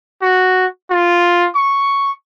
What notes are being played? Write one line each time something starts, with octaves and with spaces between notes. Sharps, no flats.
F#4
F4
C#6